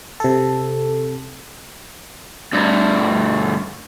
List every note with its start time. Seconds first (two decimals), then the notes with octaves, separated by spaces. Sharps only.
0.20 C3 A4
2.53 D2 G2